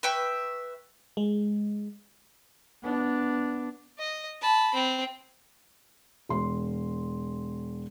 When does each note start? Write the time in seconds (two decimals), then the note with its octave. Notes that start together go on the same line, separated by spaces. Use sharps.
0.03 B4 E5 G5 C#6
1.17 G#3
2.84 B3 D4
3.99 D#5
4.42 A5 B5
4.74 C4
6.29 E1 C6